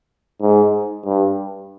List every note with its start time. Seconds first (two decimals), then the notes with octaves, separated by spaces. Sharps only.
0.41 G#2
1.05 G2